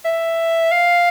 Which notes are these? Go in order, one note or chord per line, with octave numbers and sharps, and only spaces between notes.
E5
F5